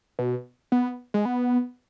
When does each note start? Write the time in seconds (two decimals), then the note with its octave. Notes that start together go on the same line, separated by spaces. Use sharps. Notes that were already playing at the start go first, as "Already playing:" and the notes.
0.19 B2
0.72 B3
1.14 G#3
1.25 B3